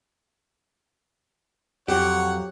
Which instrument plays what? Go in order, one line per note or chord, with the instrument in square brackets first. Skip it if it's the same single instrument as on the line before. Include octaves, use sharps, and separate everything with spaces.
[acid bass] F2 [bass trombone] F#3 [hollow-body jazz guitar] G4 [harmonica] C#5 F#5